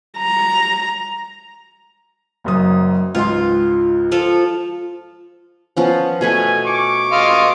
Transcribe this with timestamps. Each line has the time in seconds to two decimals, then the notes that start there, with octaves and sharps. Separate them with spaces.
0.18 A#5
2.44 F#1 F#2 D#6
3.15 C#2 G#2 F4 C6
4.11 F3 F4 A4
5.77 F3 B3 C#4
6.21 B2 A3 B4 G#5
6.65 C#6 D6
7.12 D#5 F5 C6